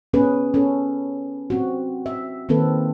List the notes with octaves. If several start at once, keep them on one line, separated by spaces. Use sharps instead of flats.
B3 C#4 G#4 B4
C#4 A4
C4 F#4
E5
D#3 A#3 C4 A4 B4